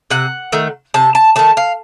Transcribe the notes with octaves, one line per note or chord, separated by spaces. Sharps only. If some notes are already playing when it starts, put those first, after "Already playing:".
C3 F#5
D#3 A3
C3 A5
A5
D#3 A3 A5
F5